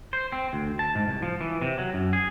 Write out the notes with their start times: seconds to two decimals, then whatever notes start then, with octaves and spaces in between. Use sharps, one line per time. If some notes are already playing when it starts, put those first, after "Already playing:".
0.13 C5
0.32 C4
0.53 D2
0.79 A5
0.95 G#2
1.08 C2
1.22 F3
1.41 E3
1.62 C3
1.78 F#3
1.94 F#2
2.13 G#4